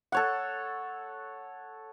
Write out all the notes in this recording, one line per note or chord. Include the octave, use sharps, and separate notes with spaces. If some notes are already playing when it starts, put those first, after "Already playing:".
A4 C#5 F#5